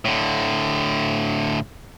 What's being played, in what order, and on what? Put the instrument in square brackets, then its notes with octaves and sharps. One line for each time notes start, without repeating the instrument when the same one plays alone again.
[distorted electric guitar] A2 D3